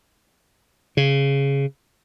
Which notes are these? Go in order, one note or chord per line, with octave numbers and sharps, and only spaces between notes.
C#3